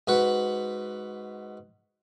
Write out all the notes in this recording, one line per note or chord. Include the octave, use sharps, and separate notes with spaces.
G#2 F#4 B4 F#5